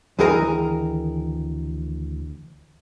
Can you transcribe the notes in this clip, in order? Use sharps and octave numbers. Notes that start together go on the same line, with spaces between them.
D2 D#3 E3 G#4 A#4 A#5